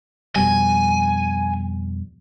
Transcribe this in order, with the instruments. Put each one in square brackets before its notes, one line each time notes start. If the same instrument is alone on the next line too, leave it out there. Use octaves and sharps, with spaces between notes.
[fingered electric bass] F2 B2 G3 [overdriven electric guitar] G#5